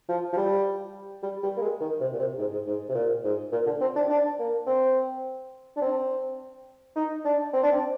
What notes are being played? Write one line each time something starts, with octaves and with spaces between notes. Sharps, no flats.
F3
F3
G3
G3
G3
A#3
G#3
D#3
C3
A#2
C3
G#2
G#2
G#2
C3
A#2
G#2
A#2
D3
C4
D4
D4
A#3
C4
D4
C4
D#4
D4
C4
D4
C4